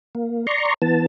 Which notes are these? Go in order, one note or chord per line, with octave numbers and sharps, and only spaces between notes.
A#3
D5 A#5 C6 C#6
E3 B3 A5